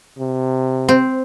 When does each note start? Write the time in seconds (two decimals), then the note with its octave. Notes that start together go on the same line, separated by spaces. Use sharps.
0.19 C3
0.89 C4